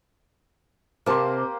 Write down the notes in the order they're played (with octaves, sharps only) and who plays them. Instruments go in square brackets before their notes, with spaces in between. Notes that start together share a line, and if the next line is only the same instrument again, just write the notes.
[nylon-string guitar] C3 C4 A5 [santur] A#3 G4 C5